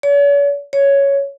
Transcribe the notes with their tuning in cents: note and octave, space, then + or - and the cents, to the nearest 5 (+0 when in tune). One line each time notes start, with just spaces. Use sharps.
C#5 +45
C#5 +5